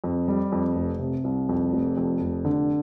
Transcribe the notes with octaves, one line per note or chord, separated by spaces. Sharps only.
F2
G3
F2
F1
C3
C2
F2
F1
F2
F1
D3